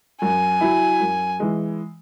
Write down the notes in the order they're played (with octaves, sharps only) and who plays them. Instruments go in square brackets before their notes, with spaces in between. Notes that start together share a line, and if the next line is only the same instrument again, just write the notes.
[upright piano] F#2 [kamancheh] G#5
[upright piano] F#3 E4
F#2
E3 G#3